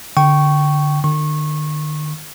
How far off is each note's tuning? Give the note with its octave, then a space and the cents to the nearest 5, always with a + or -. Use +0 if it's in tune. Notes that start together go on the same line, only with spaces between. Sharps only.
D3 +0 G5 -20 C#6 +0
D#3 -45 C#6 -25